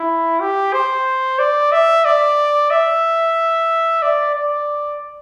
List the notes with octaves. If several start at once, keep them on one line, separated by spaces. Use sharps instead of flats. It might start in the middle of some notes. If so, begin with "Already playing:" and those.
Already playing: E4
G4
C5
D5
E5
D5
E5
D5
D5